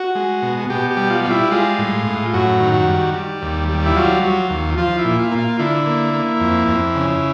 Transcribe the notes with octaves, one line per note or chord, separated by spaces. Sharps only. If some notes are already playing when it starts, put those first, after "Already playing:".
Already playing: F#4
G#3
B2
B2 G4
G4
G3
F4
G3
E4
G#3 F4
A2
A2
F#2 F#4
D#3
F#4
G3
G3
D#2
G3
E4
F#3 F4
F#3
D#2
F3 F4
E4
A#2
F4
A#3
F4
D3 E4
A#3
A#3
F2
F2
C#3